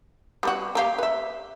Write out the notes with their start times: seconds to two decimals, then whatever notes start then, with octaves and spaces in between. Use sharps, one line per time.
0.43 G3 B3 F#4
0.75 A#3 G4 F5
0.98 B4 E5